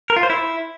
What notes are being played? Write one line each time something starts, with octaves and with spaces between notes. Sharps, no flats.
A#4
F4
C5
E4